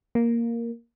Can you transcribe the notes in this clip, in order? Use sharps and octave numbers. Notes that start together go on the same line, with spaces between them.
A#3